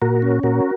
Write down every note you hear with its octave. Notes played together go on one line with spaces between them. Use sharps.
A#2 F#4 A#4
C#4
A#2 F#4 A#4